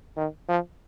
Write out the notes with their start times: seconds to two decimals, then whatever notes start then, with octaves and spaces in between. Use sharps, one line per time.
0.17 D#3
0.49 F3